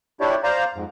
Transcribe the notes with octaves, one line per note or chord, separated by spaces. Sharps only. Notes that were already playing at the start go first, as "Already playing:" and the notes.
D4 E4 G4 C#5 D5
C5 D5 F5 A#5
F2 G#2